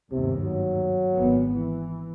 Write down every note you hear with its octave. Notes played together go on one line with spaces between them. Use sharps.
G1 D#2 G#2 C3
F#3
G#1 A#2 B3
E3